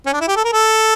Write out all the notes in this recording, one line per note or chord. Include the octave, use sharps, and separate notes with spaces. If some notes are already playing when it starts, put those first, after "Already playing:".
C#4
D4
E4
G4
A4
A#4
A4